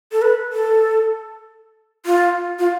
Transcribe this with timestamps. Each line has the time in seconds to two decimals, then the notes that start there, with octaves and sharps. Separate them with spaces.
0.12 A4
0.22 B4
0.53 A4
2.06 F4
2.59 F4